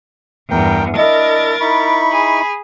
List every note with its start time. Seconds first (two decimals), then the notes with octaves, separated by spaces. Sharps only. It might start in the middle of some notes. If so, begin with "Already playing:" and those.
0.51 E2 G2 A#4 G5
0.97 D4 E4 A#4 D#5 E5 A6
1.61 D#4 E4 B5 C#6
2.12 G#4